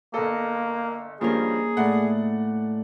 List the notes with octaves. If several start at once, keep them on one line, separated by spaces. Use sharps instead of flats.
G1 A#3 A4 D#5
G2 F3 G3 A#3 C#4 G#4 A#4
A2 D5 F#5